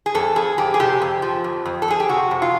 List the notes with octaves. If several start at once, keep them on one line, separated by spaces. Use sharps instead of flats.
G#4
F2 A4
F2 G#4
F2 G4
G#4
C3 G4
F2
F3
F2
F2
A4
F2 G#4
G4
C3 F#4
F2
F4